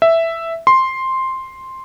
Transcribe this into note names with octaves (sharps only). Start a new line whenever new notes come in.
E5
C6